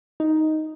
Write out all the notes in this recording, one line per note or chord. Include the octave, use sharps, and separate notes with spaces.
D#4